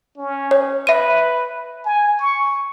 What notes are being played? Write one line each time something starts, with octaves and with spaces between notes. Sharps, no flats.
C#4
C#5
B4 E5 D#7
G#5
C#6